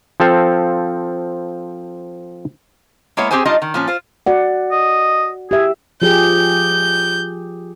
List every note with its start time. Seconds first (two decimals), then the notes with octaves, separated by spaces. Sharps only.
0.20 F3 C4 A4 F5
3.17 G#3 A#3 B3 E4 C#5
3.31 C4 D4 G4 G#4 C5 G#5
3.45 G3 D4 D#4 F4 D#5
3.62 D#3
3.74 A#2 F3 C#4
3.87 F4 C5
4.26 F#4 D5 F#5
4.72 D#5
5.51 G4 G#4 E5
6.02 F3 G4 G#4 G6